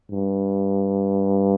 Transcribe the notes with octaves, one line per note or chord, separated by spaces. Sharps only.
G2